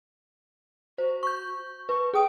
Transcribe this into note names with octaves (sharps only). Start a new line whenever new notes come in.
F#4 C5
C#6 G6
B4 C#6
G#4 G5 D#6